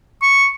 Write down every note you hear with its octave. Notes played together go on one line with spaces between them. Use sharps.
C#6